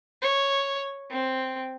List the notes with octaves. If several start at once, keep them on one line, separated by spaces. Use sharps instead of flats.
C#5
C4